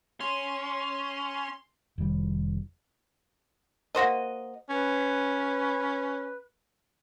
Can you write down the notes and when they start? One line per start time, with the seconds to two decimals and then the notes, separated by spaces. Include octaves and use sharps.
0.20 C#4 C6
1.98 F1 D#3 G3
3.95 A#3 F#4 C5 D#5
4.70 C#4 B4